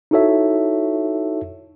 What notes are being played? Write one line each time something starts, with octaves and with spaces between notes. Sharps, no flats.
D#4 E4 F#4 A4 C#5 E5